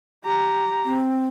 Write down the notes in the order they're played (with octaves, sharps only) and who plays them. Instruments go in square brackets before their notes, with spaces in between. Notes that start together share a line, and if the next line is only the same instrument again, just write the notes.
[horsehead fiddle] G4 A#5
[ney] C4